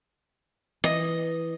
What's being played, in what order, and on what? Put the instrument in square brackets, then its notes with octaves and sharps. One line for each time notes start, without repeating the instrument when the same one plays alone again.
[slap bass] E3 [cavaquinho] D#5